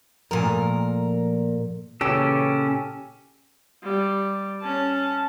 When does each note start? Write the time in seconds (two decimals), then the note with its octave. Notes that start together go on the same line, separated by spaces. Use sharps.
0.31 A#2 F3 A3 A#4 G#5
2.01 A#2 C#3 E3 C#4 G4 A4
3.84 G3
4.62 C#4 A5